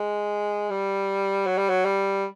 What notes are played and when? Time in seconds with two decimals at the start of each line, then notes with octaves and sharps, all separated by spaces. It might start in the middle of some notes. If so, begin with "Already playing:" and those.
Already playing: G#3
0.70 G3
1.47 F#3
1.58 G3
1.69 F#3
1.85 G3